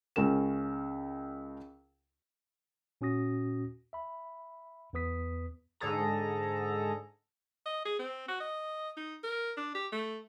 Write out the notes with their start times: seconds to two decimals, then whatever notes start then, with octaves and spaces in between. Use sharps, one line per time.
0.16 C#2 C#4 A#4 E7
3.01 A#2 C#4 F#4 D#6 A#6
3.93 E5 B5
4.93 E2 B3 B4 D#6 B6
5.80 G#2 D3 G#4 A4 A#5
7.66 D#5
7.85 G#4
7.99 C4
8.28 F#4
8.40 D#5
8.97 D#4
9.23 A#4
9.57 D4
9.75 G4
9.92 A3